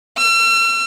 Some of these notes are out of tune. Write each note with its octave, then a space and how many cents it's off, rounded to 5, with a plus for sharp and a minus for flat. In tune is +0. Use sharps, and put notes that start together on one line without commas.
E6 +45